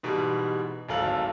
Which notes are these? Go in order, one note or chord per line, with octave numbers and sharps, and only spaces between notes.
G#2 B2 E3 G3
D1 G#1 A4 F5 F#7